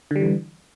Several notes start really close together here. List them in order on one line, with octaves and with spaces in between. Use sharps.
D3 G3 E3